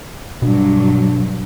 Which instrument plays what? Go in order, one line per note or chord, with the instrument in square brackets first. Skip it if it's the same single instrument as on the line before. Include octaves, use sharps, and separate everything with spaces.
[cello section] G2 F#3 [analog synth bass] B2 [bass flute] D4